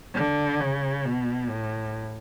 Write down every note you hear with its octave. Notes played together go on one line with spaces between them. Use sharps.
D3
C#3
B2
A2